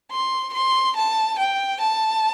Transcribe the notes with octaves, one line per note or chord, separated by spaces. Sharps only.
C6
C6
A5
G5
A5